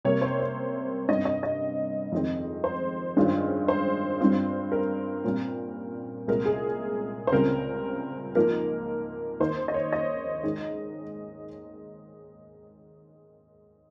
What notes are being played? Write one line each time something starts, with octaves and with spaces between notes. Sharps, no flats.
C3 G3 A#3 C#5
C5
C#5
G2 G3 C4 D#5
D#5
D#5
F2 D#3 G#3 C4
C5
G2 D#3 G#3 C#4 F4
C5
G2 G3 C4 F4
A#4
A#2 G3 C4
C2 A#2 G#3 A#4
G#4
C5
C#2 C#3 G3 C4 F4 A#4
G#2 F3 A#3 F4 A#4
D#2 D#3 A#3 D#4 C5
D#5
C#5
D#5
G#2 D#3 G#3 D#4